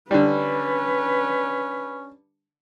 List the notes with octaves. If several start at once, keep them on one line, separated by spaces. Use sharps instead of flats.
D3 G3 C#4 B4